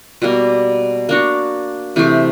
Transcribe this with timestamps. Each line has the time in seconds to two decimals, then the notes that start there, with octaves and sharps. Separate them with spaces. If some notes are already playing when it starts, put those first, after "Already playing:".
0.22 B2 G3 A#3
1.09 A#3 D4 F#4
1.96 C3 E3 A3